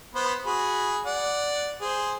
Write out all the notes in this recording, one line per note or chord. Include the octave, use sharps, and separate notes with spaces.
B3 B4 C5
F#4 G#4 B5
D5 F#5
G#4 C5